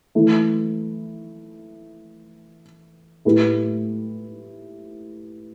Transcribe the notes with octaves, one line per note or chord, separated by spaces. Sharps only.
E3 A3 E4
A2 A3 E4 G4 B4